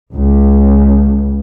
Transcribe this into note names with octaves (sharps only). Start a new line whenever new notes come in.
C#2